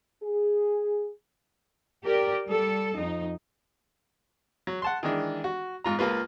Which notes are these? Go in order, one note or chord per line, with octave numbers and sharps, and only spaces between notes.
G#4
G4 A#4 D5
G3 A4
F2 D#4
F#3
F#5 A5 C6
D#3 E3 G#3 D4
F#4
G#2 F4 A#5
C#2 A#3 F4 B4